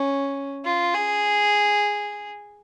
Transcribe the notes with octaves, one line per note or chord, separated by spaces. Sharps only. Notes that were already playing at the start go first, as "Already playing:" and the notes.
Already playing: C#4
F4
G#4